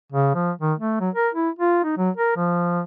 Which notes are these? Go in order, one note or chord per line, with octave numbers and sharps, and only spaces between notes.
C#3
F3
D#3
A3
F#3
A#4
E4
F4
D#4
F#3
A#4
F3